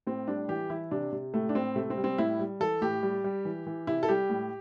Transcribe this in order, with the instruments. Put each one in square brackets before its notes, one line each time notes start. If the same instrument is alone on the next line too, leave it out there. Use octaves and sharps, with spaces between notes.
[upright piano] A2 C4
G3 D4
E3 G4
E3 E4
C3 D4
C3
A2 A3
D4
A2 C4
C3 A3
C4
G3
C4
A2 E4
G3
E3 A4
A2 G4
G3
G3
E3
E3
C3 E4
A4
G3 G4
A2